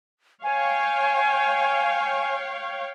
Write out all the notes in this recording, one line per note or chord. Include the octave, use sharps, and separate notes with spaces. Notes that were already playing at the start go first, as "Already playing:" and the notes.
C#5 F5 G5 G#5